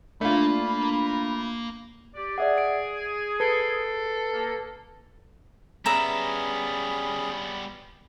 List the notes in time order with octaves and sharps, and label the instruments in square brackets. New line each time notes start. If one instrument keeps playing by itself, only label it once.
[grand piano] A3 F4 [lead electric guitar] A#3 F5 [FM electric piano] D4 [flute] B5
[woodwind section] G4 D5
[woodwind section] G#4 [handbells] D5 E5 F#5
[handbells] D7
[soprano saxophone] A4 [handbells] B4 C7 D7
[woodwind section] A#3
[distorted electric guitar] G3 B3 [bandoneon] C#4 G#4 [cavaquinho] B4 E5 A#5